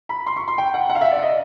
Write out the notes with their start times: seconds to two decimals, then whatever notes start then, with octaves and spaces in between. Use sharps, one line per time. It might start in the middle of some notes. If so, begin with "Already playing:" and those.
0.09 B5
0.26 C6
0.36 C#6
0.48 C6
0.58 G5
0.74 F#5
0.89 F#5
0.95 F5
1.01 E5
1.11 D5
1.22 D#5